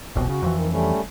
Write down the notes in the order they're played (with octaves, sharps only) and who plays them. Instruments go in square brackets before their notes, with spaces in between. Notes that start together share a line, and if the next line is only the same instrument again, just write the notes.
[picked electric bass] F1 C2 B2
[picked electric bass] C#3 [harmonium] F#4
[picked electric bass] F2 E3
[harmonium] D#3
G3 A3 C#4